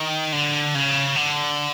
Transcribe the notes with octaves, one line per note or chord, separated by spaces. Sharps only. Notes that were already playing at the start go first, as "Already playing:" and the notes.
Already playing: D#3
D3
C#3
D3